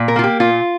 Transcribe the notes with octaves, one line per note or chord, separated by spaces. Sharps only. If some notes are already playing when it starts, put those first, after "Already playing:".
Already playing: A#2
A#4
A#3 F4
G4
A#2 F4